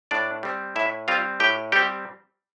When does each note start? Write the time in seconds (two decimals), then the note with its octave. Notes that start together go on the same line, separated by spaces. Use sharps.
0.11 A2 D4 D5
0.43 G3 C4
0.76 A2 E4 E5
1.08 G3 C4 F4 F5
1.40 A2 G4 G5
1.72 G3 C4 G4 G5